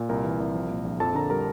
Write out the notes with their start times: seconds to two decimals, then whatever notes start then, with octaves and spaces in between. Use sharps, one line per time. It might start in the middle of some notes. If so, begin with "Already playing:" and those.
Already playing: A#2
0.09 C2 A#4 A#5
0.24 E3
0.40 C2
0.55 F3
0.71 A#2
0.85 A#1
1.00 F2 A4 A5
1.15 D3 A#4 A#5
1.30 G3 A#4 A#5